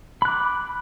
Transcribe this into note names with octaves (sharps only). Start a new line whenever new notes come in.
B5 D6 F#6